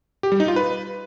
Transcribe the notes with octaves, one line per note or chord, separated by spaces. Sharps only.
G4
G3
D#4
F4
B4